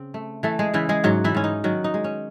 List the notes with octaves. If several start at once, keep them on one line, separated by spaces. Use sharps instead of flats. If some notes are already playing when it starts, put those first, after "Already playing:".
Already playing: C#3 C4
A3
E3 A3 A4
G#3 G#4
C#3 E3 E4
G#3 G#4
G#2 F#3 F#4
E3 E4
G#2 C#4
D#4
D#3 F#3 F#4
D#4
G#3
C#4